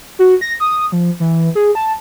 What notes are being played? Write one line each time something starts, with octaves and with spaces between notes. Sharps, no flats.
F#4
A#6
D#6
F3
E3
G#4
A5